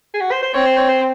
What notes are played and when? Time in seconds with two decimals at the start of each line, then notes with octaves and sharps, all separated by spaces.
0.14 G#4
0.21 F#4
0.31 C5
0.43 C5
0.54 C4 C#5
0.66 C5
0.77 C#5
0.89 C5